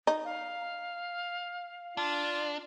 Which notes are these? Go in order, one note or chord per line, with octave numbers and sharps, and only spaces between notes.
D#4
F5
D4 F4